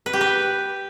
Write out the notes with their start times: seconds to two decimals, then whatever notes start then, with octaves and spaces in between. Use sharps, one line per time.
0.06 B4
0.13 G4
0.21 B4